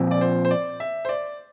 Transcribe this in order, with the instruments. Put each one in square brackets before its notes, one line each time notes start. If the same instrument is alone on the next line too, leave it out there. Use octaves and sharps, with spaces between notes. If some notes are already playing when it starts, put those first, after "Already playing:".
Already playing: [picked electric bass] A#2 F3 C4
[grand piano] D5
C5
C5
D5
E5
C5
D5